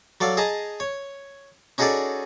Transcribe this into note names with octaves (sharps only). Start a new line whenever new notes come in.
F#3 A4 D5 F5
G#4 D#5 A5 A#5
C#5
C#4 D#4 F#4 G#4 A4 D5